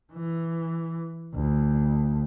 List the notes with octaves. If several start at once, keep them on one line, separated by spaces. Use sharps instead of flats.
E3
D2